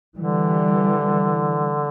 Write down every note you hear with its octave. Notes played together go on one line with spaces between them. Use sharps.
D3 E3 G3